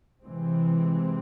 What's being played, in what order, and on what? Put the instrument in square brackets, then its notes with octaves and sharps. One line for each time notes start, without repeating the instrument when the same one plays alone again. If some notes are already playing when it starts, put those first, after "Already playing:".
[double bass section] C3 E3 G#3 C4